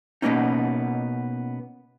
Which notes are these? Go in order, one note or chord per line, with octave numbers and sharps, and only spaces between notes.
B2 D3 A#3 B3 C#4 D#4